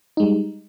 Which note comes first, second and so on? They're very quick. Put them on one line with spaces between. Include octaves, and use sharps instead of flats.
D#4 G#3 G3